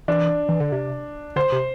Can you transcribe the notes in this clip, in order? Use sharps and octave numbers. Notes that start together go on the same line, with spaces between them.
E3 D4
E3
D3
C3
D3 C5
C3